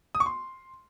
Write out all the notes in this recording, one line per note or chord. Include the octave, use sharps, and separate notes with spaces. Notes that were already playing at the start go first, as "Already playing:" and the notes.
D#6
C#6
C6